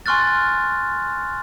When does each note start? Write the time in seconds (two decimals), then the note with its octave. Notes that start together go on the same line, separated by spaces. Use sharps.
0.06 G#5 C6 C#6 F6 F#6 A6